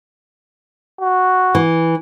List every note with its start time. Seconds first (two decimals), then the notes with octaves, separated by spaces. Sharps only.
1.01 F#4
1.55 E3